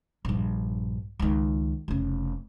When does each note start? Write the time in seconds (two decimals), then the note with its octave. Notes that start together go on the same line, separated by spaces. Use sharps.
0.25 A#1 G2
1.19 C#2 D#3
1.88 F1 C#3